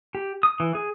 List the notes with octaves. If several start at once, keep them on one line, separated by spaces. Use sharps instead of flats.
G4
D#6
E3
G#4